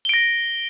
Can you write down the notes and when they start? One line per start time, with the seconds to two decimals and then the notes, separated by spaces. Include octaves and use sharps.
0.05 G7
0.09 D7
0.14 A#6